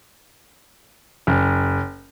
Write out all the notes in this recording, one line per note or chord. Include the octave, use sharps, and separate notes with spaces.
F#1